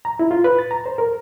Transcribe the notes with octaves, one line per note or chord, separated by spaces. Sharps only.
A#5
E4
F4
B4
A6
A#5
C5
A#4